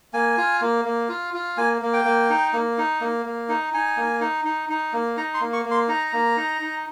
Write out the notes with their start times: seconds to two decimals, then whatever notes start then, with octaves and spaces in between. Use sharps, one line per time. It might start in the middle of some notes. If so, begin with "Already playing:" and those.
0.13 A#3 G#5
0.38 F4
0.61 A#3
0.85 A#3
1.09 F4
1.34 F4
1.57 A#3 G#5
1.82 A#3
1.93 G5
2.05 A#3
2.30 D#4
2.53 A#3
2.78 D#4
3.01 A#3
3.26 A#3
3.49 D#4
3.74 D#4 G#5
3.97 A#3
4.20 D#4
4.45 D#4
4.69 D#4
4.93 A#3
5.17 D#4 A#5
5.34 C6
5.41 A#3
5.53 C#6
5.65 A#3
5.71 C6
5.88 D#4 A#5
6.13 A#3
6.37 D#4
6.61 D#4